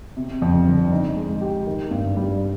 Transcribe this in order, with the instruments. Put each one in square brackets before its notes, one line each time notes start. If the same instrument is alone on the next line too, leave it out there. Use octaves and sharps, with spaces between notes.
[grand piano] C3
F2
G1
D#4
G#3
G4
D#3
G2
G3